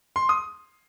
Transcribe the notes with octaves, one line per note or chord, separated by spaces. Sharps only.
C6
D#6